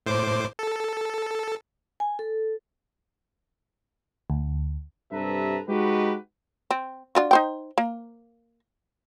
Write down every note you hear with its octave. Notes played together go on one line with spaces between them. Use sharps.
A2 C5 D6
A4
G#5
A4
D2
G2 C3 A4 B4 E5 A#5
G#3 D#4 F#4 G4 B4
C4
D4 F4 F#4
D#4 C5 G5
A#3